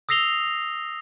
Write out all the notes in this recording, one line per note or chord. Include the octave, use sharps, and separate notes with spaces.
D#6 E6 A#6 C7 F7 G7